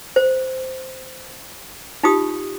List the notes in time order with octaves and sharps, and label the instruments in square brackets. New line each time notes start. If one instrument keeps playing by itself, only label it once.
[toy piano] C5
D#4 F4 G4 D#6